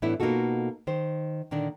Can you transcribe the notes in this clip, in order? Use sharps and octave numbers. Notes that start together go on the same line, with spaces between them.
A2 E3 A3 B3 D4 E4
B2 A#3 D#4 F4 F#4 A4
D#3 C5
A#2 D3 D#3 A#3 D4